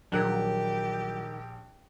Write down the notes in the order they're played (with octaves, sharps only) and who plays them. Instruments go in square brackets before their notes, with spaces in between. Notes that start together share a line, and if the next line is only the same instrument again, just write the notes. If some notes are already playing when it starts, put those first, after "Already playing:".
[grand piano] A#1 F#6 [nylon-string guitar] D#3 G3 A#4 [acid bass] F#3 [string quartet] G4